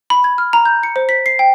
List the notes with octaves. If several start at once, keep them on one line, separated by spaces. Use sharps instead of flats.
B5
G#6
F6
A#5
G6
C#7
C5
B6
C7
G5